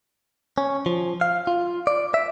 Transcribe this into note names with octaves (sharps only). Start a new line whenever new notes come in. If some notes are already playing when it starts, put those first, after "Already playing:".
C#4
F3
F5
F4
D5
E5